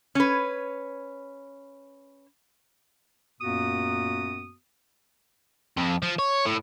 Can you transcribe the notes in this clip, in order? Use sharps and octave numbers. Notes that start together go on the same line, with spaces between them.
C#4 B4
F#2 A#2 A#3 B3 F#4 D#6
F2
F3
C#5
A2